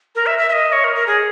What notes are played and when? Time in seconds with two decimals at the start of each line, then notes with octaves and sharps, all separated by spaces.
0.15 A#4
0.26 E5
0.39 E5
0.49 E5
0.53 D#5
0.72 C#5
0.84 A#4
0.96 A#4
1.07 G#4